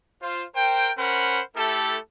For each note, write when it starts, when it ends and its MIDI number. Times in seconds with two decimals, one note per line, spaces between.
0.22 0.44 65
0.22 0.44 72
0.55 0.89 70
0.55 0.89 72
0.55 0.89 79
0.97 1.41 61
0.97 1.41 70
0.97 1.41 72
0.97 1.41 78
0.97 1.41 83
1.55 1.97 57
1.55 1.97 64
1.55 1.97 67
1.55 1.97 69